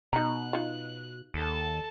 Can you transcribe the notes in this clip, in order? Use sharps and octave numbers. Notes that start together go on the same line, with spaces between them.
B2 D#4 A#5 F#6
D#4 F4
D#2 A4 A5